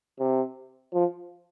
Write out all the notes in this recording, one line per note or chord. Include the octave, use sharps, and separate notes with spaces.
C3
F3